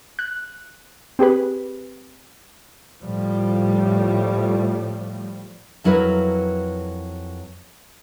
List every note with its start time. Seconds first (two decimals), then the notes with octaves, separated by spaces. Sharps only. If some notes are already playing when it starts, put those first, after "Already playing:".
0.19 F#6
1.19 C4 G4 G#4 B4
3.03 A2 F3 G3
5.84 F2 F#3 E4 A#4 B4